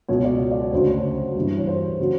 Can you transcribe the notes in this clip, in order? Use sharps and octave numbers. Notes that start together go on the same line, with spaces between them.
C#2 B2 F#3 C#5
D5
D5
C#5
D2 C#3 F#3 C5
C#5
G2 E3
C#5
C5
C#3 F#3